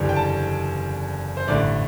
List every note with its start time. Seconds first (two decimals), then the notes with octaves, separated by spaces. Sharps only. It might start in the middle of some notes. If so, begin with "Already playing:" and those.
Already playing: F#1 E2 D3 G3
0.09 G5
0.16 A5
1.37 C5
1.47 A1 G2 D3 A3 D5